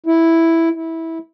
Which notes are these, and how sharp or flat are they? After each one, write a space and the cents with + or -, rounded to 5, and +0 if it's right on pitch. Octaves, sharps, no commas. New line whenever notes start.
E4 +0
E4 -15